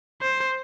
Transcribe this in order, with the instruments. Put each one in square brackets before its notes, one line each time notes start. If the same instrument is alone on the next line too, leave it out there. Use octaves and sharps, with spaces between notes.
[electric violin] C5